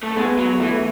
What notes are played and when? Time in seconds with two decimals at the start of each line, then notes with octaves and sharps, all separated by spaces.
0.03 A3
0.17 G#3 B3
0.39 F#3
0.60 E3 A3